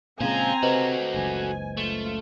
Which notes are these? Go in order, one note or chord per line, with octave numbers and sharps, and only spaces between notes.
A#2 C#3 G#3 C4 C5 F5 G#5 A#5
C3 A3 F#4 B4 C5 D#5
F#1 C#2 G#5
A3 F4